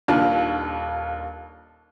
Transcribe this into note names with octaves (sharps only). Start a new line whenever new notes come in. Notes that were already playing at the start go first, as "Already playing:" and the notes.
D#1 D#2 D4 F4